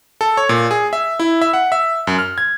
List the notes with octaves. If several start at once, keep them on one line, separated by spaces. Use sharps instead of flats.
A4
C#5
A#2
G#4
E5
E4
E5
F#5
E5
F#2
F6
G#6